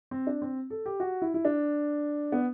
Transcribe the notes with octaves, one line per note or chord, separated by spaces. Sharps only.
C4
D4
C4
A4
G4
F#4
E4
E4
D4
B3